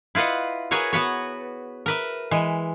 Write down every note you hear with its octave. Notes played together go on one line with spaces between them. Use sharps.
E4 F4 B4 D#5 F#5
F#4 G#4 A#4 B4 C#5 E5
B3 F#4 B4 C#5
A#4 B4 E5
E3 G#3